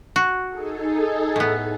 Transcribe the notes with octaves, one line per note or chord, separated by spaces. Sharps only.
F#4
D#4 G#4 A4
A2 B3